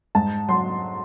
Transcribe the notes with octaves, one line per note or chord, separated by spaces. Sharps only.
G#2 A5
F#3 C6